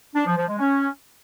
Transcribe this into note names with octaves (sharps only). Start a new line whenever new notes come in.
D4
F3
F3
G#3
C#4